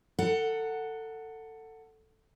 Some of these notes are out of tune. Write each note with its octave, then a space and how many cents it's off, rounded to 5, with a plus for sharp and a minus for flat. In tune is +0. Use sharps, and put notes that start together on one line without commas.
A4 +20 F#5 +0 A#5 +0